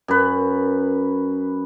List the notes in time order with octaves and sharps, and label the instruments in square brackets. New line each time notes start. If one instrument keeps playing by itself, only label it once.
[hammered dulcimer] F#2 B4